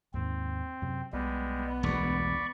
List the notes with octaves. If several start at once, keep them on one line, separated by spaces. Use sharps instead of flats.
D#2 G#2 D#3 C4
F#2 C3
B1 G3 G#3 B3
E1 D2 D5 B5 C#6